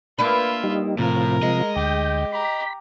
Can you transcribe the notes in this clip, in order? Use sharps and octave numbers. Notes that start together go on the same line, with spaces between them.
A#3 D4 F4 B4 E5
G3 D#4
A2 C3 F3 A#4
G#3 D#5
D2 G4 G5
G4 A#5 B5